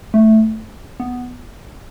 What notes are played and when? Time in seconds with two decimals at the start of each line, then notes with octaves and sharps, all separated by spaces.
0.14 A3
1.00 B3